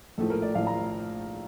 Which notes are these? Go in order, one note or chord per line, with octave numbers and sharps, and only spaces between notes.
A#1 A2 F3 A3 A4
A#4
D5
A#1 A2 F3 A3 F5
A#5